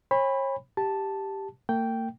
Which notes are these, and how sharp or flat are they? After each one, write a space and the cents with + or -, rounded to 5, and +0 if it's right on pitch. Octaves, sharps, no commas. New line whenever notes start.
C#5 -40 G#5 -45 B5 +0
G4 +0 A5 +0
A#3 -45 G5 -5